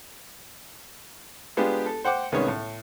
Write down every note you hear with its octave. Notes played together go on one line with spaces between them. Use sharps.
G#3 B3 D4 F4 G4
A4
C5 F#5 G5 D6
C2 D#3 G#3 B3 C#4 C#5
A2